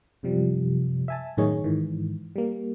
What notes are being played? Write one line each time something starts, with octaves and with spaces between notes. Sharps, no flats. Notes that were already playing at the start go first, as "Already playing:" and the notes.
F#2 C3 F3 G3
E5 G#5 A5
F#2 A2 D#3 D#4 G#4 C#5
G#2 D#3 E3
G3 A#3